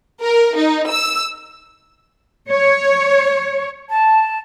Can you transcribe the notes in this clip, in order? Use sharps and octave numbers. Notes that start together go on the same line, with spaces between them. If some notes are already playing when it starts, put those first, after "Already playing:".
A#4
D#4
E6
C#5
A5